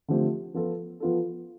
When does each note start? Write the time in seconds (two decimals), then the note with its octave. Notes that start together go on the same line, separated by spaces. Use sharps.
0.08 D3 F3 A3 C4 G4
0.54 F3 B3 F4 A4
1.00 F3 B3 F4 A4